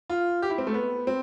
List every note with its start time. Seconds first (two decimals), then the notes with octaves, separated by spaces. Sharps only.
0.10 F4
0.42 G4
0.50 E4
0.58 C4
0.67 A3
0.74 B3
1.07 C4